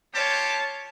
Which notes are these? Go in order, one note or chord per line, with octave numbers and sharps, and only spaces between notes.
F4 G4 C#5 A5